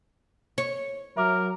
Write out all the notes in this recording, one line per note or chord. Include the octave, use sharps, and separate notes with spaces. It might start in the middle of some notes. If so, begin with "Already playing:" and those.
C#5
F#3 A#4 E5 D6 F6